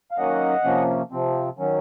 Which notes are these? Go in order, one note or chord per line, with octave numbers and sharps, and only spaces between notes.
F5
D#3 F#3 A#3 C#4 D#5 F#5
C3 F3 A#3 C#4
C3 F3 C4
D#3 F#3 C#4